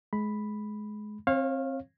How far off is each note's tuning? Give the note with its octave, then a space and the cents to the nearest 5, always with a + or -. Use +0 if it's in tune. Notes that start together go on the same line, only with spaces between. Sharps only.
G#3 +25 B5 +0
C4 +20 C#5 -35 F5 +0